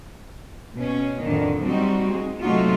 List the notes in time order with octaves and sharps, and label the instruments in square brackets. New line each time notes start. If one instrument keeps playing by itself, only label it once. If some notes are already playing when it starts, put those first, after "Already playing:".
[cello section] B2 C#4
F2 A2 D3 D#3
G3 C4 D#4 F#4
G#3
C3 F#3 A3 D#4 F4 F#4